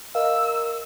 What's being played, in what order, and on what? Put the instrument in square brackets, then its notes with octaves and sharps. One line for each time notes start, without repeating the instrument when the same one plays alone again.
[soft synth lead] A#4 [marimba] D#5 [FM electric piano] F5 [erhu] E6